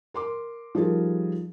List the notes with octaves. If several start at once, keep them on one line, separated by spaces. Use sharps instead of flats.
A#4 C6 D6
F3 G3 D#4 F4 G#4 A#4